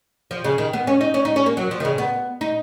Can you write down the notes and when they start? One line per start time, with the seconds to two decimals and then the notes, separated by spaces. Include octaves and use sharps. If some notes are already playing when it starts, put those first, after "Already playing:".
0.31 F3
0.44 C#3
0.58 D#3
0.73 B3
0.87 C#4
1.01 D#4
1.14 C#4
1.25 D#4
1.36 C#4
1.46 A#3
1.57 F#3
1.71 F3
1.80 D#3
1.85 C#3
1.98 B3
2.41 D#4